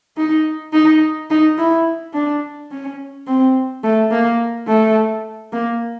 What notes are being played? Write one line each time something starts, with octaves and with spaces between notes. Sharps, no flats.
D#4
D#4
D#4
E4
D4
C#4
C4
A3
A#3
A3
A#3